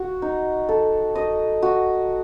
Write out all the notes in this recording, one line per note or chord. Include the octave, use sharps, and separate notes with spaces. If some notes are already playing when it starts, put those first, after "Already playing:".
Already playing: F#4
D#4
A4
D#5
F#4